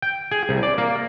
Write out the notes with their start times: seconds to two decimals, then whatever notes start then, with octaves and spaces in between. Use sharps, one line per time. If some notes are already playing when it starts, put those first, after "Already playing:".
0.02 G5
0.31 G#4
0.49 C2
0.63 D5
0.78 A#3